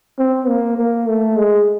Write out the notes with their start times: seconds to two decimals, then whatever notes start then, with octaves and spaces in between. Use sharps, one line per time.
0.19 C4
0.48 A#3
0.78 A#3
1.07 A3
1.37 G#3